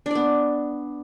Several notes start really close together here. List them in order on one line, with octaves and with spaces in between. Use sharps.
D4 D5 B3